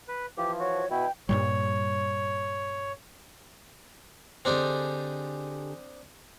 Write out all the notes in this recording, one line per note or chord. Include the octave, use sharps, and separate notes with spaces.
B4
E3 F3 G4 F5
F#4 C#5
B2 E4 G5
G2 A#2 G3 C#5
D3 C4 D4 D#4 G4 G#4